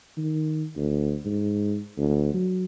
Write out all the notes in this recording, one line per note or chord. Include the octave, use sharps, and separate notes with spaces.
D#3
D2
G#2
D2
F#3